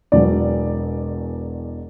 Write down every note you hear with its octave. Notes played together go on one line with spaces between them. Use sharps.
E1 E2 B2 F#3 D5